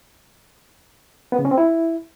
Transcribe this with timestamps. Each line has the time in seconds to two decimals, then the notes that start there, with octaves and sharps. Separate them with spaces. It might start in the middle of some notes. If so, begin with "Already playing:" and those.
1.32 B3
1.39 C#3
1.45 C#4
1.51 C4
1.58 E4